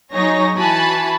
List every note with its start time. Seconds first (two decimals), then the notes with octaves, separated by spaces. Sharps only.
0.14 F#3 D#4 G#4 C#5 A#6
0.56 E3 F#4 G#5 A5 B5